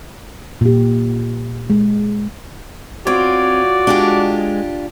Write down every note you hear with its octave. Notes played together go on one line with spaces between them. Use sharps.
A#2 G4
G#3
C4 F4 F#4 C#5 D5
G#3 D4 F4 G4